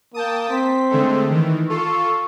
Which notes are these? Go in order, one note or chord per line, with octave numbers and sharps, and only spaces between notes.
A#3 G5 A5 D#6
C4 B6
D3 G#3 A3
D#3 E3
F4 A4 C#6